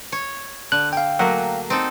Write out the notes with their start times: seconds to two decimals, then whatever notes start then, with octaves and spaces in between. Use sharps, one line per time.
0.12 C#5
0.72 D3 F#6
0.93 F5 G5
1.19 F#3 A3 A#3 F#5
1.70 C4 D#4 A4